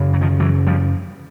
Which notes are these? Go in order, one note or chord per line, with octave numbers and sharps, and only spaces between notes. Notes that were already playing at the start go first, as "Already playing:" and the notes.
Already playing: F#2 C#3
F#3
D#3 F3
E3 F#3
F3 G3